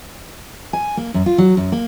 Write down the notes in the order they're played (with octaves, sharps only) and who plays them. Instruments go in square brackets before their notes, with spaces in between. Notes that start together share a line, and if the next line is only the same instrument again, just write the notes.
[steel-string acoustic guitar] G#5
A#3
F#2
F4
F#3
F#2
A#3